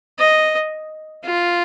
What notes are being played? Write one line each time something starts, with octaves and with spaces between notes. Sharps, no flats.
D#5
F4